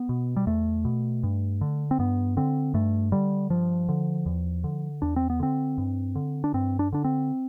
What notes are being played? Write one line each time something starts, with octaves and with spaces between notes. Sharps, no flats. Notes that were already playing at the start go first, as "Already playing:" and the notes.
Already playing: B3
B2
G3
E2 A3
B2
G2
D3
C4
G2 B3
D3 C4
G2 A3
D3 G3
G2 F3
D3
E2
D3
E2 D4
C4
B3
D3 C4
G2
D3
D4
G2 C4
D4
D3 D4
C4